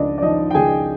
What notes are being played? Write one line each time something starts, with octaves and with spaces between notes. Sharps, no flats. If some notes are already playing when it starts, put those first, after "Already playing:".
Already playing: C#2 F3 D4 D5 D#5
D5
F3 D#4 D#5
G5
C#2 G#4 G#5